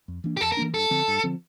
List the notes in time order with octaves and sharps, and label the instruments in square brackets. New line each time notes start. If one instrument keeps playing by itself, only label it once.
[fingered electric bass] F2
E3 A#3 D4
[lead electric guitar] G4
[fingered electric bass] F2 [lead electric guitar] A4
[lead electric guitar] A#4
[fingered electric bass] E3 A#3 D4
[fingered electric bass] G2 [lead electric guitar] A4
[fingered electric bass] D3 F3 C4
G2
D3 F3 C4